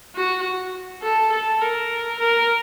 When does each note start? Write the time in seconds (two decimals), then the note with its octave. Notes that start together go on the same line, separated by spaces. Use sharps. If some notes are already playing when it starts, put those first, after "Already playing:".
0.16 F#4
1.03 A4
1.32 A4
1.61 A#4
2.19 A#4